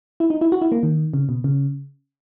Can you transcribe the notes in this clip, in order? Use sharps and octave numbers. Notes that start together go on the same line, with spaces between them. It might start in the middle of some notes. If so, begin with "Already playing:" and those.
E4
D#4
E4
F#4
E4
A#3
D#3
C#3
B2
C#3